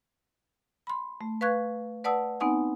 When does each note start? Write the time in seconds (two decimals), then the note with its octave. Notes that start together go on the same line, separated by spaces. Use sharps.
0.87 B5 C6
1.21 A3
1.41 B4 F5 C#6 F#6 G#6
2.04 B4 D5 F#5 A5 D#6 E6
2.40 B3 C4 D#4 F#5 G#5